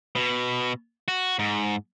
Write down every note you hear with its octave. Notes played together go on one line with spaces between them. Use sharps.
B2
F#4
G#2